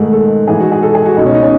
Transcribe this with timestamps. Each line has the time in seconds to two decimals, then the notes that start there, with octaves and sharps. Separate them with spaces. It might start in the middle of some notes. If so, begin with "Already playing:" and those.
Already playing: G#2 D#3 G#3 A3
0.13 A4
0.47 G#2 E3 G#4
0.60 F#4
0.72 G#4
0.83 A4
0.95 G#4
1.06 F#4
1.17 C#2 B2 D#4
1.26 C#4
1.34 D#4
1.43 C#4